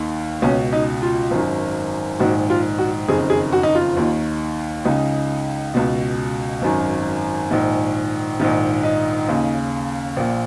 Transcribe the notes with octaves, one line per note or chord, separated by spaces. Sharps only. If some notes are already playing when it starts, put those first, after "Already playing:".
Already playing: D#2 D#3
C#2 B2 C#4
D#4
F4
G#1 F#2 D#3
A#1 G#2 D#3 F#4
F4
F#4
F#1 F2 D#3 G#4
G#4
F#4
D#4
F4
D#2 D#3
C#2 C#3 D#4
C#2 B2
G#1 F#2 D#3
A#1 G#2 D#3
A#1 G#2 D#3 D#4
D#4
D#2 C#3
A#1 A#2